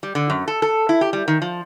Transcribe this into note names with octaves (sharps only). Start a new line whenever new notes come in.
G3
D3
F#2
A4
A4
E4
G4
G3
D#3
F3